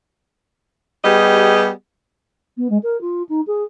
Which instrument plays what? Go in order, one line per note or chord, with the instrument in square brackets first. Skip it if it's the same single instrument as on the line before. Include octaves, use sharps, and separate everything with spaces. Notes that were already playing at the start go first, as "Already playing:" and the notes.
[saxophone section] G3 B3 G4 G#4 D#5
[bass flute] B3
G#3
A#4
F4
D#4
G#4